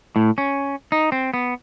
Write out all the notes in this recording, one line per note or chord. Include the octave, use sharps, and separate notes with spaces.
A2
C#4
D#4
C4
B3